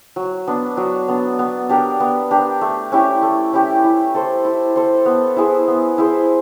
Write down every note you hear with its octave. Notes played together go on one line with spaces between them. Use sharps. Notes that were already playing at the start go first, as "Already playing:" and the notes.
F#3
B3 D4
F#3
B3 D4
B3
D4 G4 A#4
B3
D4 G4 A#4
A3
C#4 E4 G4
A3
C#4 E4 G4
E4
A4 C5
E4
A4 C5
B3
E4 G#4 C5
B3
E4 G#4 C5